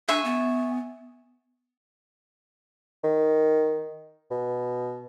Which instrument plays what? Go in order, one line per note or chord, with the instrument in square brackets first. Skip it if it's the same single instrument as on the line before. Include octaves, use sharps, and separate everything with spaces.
[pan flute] D4 [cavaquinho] E5 G#5 C#6
[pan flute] B3
[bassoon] D#3
B2